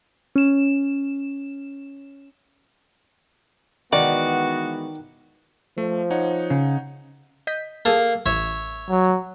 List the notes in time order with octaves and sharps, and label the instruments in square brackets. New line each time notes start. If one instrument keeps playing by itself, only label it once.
[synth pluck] C#4 E7
[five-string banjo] D#3 [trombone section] E3 G#3 B3 [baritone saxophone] F#4 [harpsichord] D5
[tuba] F3 [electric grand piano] A3
[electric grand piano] D#4 C#5 F#5
[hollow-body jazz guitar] C#3
[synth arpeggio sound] D#5 G6 B6
[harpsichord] A#3 [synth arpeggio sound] G#4 A4
[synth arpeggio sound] A1 [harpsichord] C#5 E5
[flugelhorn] F#3